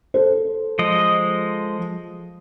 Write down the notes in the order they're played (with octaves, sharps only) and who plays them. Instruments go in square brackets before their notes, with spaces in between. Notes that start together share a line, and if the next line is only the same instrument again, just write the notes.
[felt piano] A4 C5
[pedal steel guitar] F3 G#3 D#5